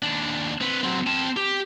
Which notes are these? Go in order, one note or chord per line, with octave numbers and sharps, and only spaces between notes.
D#2 D4
C4 B4
F#3 C4
C4 A5
G4